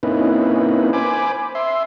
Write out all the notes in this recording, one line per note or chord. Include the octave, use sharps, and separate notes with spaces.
A#3 C4 C#4 D#4 E4 B4
C5 G#5 B5 D6
E5 C6